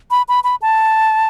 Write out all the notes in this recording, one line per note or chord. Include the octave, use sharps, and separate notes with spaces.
B5
B5
B5
A5